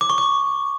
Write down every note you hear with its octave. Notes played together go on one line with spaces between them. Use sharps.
D6
C#6
D6